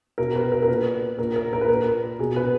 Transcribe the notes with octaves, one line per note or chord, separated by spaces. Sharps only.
B2 A#4
B4
A#4
A#4
A#2 B4
A#2 A#4
A#4
A#4
B4
A#2 A#4
B2 G#4
B4